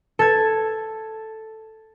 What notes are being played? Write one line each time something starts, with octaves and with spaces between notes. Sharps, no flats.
A4 G#6